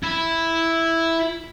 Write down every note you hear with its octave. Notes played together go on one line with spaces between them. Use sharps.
E4